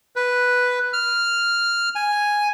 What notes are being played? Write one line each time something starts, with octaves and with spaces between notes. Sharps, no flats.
B4
F6
G#5